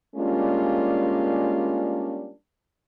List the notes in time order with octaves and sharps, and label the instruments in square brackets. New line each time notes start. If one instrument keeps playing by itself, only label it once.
[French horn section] G3 G#3 A#3 C#4 D4 F4